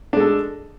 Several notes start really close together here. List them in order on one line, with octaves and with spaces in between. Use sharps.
D4 G#3 A4